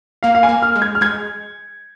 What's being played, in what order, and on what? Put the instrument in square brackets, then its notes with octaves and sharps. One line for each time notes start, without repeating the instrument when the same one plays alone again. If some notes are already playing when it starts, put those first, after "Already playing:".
[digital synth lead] A#3 [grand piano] F5
[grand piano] F5
G#5
[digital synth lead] A#3
[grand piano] F6
[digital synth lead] G#3
[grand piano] G#6
F6
[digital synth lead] G#3 [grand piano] G#6